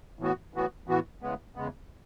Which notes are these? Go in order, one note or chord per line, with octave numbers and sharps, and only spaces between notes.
A2 E3 B3 F#4
A2 E3 B3 F#4
A2 E3 B3 F#4
E2 C#3 G#3 B3
E2 C#3 G#3 B3